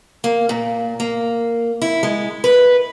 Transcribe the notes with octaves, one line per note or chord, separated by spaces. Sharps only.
A#3
A#2
A#3
E4
G#3
B4